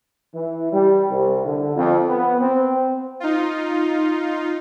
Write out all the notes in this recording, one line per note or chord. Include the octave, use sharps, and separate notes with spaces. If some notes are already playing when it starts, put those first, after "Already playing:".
E3
G3
C2
D3
F2
B3
C4
D#4 F4